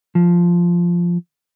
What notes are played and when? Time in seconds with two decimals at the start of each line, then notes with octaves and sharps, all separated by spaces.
0.15 F3